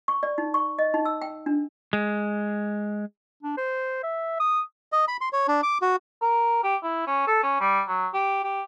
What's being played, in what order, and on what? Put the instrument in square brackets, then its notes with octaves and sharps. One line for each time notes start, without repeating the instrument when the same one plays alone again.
[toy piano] C#6
D5
D#4
C#6
D#5
D#4
E6
G5
D4
[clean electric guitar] G#3
[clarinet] D4
C5
E5
D#6
[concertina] D#5
B5
C6
C#5
D4
D6
F#4
[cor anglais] A#4
G4
E4
C#4
A4
C#4
G3
F#3
G4
G4